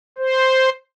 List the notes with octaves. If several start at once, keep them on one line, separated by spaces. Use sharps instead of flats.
C5